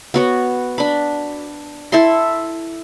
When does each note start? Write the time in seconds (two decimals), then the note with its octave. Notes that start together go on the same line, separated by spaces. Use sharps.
0.14 B3 F#4 C#5
0.78 D4 B5
1.92 E4 A4 E5 C6